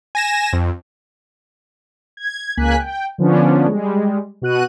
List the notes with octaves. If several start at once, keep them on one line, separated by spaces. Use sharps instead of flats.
G#5 A#6 E7
F2
G#6
C#2 A#3 G#5 F#6 B6
G5
D3 F3 B3 C#4 D4
G3 G#3
B2 F#4 F#6 D#7